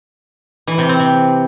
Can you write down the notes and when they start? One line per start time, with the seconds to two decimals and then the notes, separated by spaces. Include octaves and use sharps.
0.67 E3
0.78 C3
0.89 C4
1.00 C3